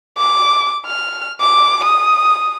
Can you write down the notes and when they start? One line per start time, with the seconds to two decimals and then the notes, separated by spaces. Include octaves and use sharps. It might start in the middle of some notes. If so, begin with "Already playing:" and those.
0.17 D6
0.86 F6
1.40 D6
1.84 D#6